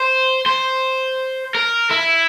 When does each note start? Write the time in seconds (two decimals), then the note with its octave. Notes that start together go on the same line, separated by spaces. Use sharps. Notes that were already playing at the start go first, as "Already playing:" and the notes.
Already playing: C5
0.46 C5
1.55 A#4
1.91 E4